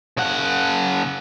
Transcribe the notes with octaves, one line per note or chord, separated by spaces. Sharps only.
C#3 F#5